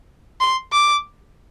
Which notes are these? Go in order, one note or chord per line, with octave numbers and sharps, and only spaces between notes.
C6
D6